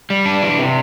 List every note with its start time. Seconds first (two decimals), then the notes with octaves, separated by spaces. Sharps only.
0.10 G3
0.26 D4
0.42 E3
0.59 C3